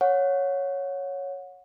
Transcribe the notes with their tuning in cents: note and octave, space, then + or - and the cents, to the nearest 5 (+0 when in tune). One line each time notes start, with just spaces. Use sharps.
C#5 +0 F#5 -25